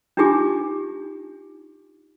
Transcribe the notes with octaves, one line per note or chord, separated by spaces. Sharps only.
D4 D#4 F4 G4 G#5 D6